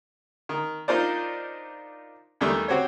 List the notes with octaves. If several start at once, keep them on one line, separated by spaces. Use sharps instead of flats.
D#3
D4 D#4 F4 A#4 C5 D5
E2 D#3 G3 A3
C4 F#4 G4 C5 C#5